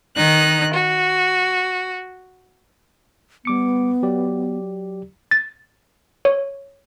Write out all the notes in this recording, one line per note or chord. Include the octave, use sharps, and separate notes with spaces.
D#3 D#4 F#6
F#4
G3 B3 D6 C#7
F#3 G4 D5
A6
C#5